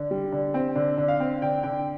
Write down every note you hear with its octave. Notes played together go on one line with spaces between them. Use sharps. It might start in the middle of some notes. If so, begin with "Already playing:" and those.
Already playing: D3
G3
D3
C4
D3
D3
F5
C4
D3 G5
D3 G5